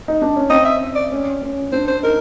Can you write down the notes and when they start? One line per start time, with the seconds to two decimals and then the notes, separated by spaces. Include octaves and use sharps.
0.08 D#4
0.22 D4
0.36 C#4
0.50 C4 D#5
0.65 E5
0.96 D5
1.12 C#4
1.42 C#4
1.72 D4 C5
1.88 C5
2.03 D#4 A#4